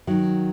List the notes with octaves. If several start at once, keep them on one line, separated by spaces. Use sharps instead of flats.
D#3 F#3